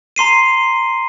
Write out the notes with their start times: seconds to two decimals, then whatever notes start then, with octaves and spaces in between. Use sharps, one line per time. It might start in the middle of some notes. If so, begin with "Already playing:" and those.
0.16 A#5 C6 C7 D#7